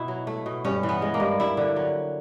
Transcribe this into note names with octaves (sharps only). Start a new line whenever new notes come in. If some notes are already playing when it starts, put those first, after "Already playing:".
Already playing: B2 E4
F#3
A3
B2
G2 C#4
E3
B3
G#3
A#3
G2
G2 E4
D3
F#3